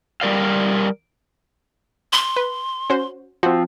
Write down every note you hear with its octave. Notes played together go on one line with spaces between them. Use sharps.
G3 A#4 D5 F5
C6
B4
C#4 F#4 C5
F3 C4 F#4 C5